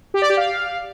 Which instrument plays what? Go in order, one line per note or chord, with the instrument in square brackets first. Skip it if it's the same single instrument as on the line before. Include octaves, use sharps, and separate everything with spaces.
[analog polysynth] G4
D5
G4
F5